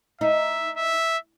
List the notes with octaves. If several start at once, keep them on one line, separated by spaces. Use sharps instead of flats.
D#4 E5
E5